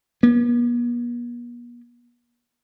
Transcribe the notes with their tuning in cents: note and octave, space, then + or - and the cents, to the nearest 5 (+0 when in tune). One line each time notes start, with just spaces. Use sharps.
B3 -45